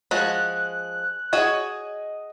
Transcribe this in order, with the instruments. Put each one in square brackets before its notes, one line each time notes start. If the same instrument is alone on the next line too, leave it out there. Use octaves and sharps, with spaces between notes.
[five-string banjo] F3 G#3 F#4 [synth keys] F#6
[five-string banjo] F#4 G#4 C#5 [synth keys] D#5